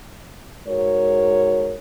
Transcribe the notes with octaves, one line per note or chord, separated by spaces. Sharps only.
G#2 F#4 A#4 C#5